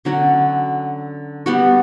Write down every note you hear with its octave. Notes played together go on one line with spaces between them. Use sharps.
D3 F#3 C#4 F#4
G3 B3 F#4